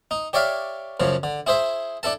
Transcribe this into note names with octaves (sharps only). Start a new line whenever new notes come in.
D#4
G4 C#5 D5 E5 F5
F#2 C#3 F3
D3
E4 G#4 C5 E5
D4 E4 A4 A5